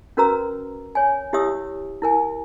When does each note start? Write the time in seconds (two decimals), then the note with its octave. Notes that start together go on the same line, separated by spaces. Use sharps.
0.17 C#4 F#4 A#4 B4 A#5 E6
0.95 C#5 G#5
1.33 E4 G4 C#5 E5 D#6 E6
2.02 E4 A#4 G#5